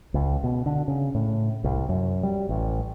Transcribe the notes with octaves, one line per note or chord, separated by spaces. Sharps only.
C#2
B2
D3
C#3
A2
C2
F#2
G3
A1